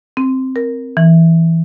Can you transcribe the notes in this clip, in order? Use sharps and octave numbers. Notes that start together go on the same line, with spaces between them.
C4
A#4
E3